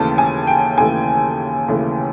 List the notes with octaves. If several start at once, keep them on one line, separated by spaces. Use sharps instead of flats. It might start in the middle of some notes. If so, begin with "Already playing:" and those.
Already playing: D#2 C#3 E3 A3 A5
G#5
G5
D#2 C#3 E3 A3 G#5
D#2 C#3 E3 A3